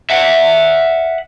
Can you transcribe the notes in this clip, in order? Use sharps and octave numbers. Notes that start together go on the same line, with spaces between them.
E5 F#5